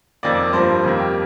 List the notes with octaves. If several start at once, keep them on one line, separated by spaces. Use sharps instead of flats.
F2 D#3 A#3 D5
G2 F3 A#3 C5
F2 D#3 G3 A#3
G4